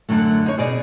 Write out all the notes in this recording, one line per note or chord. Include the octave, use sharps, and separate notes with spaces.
F#2 D3 F#3 A3
D#4 C#5
B2 G#4 D5 D#5